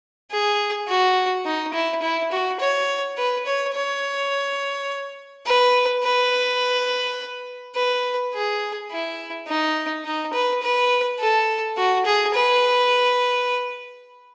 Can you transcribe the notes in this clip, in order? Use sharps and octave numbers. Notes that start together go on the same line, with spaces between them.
G#4
F#4
D#4
E4
E4
F#4
C#5
B4
C#5
C#5
B4
B4
B4
G#4
E4
D#4
D#4
B4
B4
A4
F#4
G#4
B4